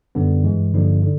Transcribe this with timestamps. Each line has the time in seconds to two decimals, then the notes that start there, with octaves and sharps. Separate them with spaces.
0.15 F#2 D3 G3 B3 D4
0.44 G2 E3 G#3
0.74 G2 D3 F3 A#3 D#4
1.03 D3